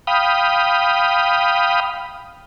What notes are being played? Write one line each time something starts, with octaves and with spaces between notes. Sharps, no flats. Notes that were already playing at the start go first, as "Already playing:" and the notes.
F5 G5 B5 D#6